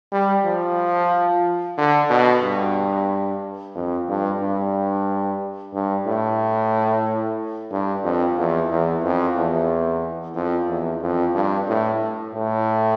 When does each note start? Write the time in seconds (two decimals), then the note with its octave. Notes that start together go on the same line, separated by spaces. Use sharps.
0.12 G3
0.45 F3
1.77 D3
2.10 B2
2.43 G2
3.75 F2
4.08 G2
4.41 G2
5.74 G2
6.07 A2
7.72 G2
8.04 F2
8.37 E2
8.71 E2
9.04 F2
9.36 E2
10.36 F2
10.69 E2
11.02 F2
11.35 G2
11.68 A2
12.34 A2